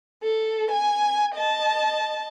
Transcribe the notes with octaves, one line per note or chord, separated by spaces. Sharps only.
A4
G#5 G#6
D#5 A5